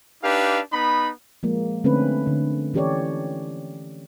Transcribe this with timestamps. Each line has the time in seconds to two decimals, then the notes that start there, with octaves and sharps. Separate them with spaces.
0.24 D4 D#4 G4 B4 F5
0.73 B3 D#4 B5
1.43 F3 G#3 A#3
1.84 D3 A3 C4 C#4 B4
2.27 D3
2.74 E3 C#4 G4 A4 C#5 D5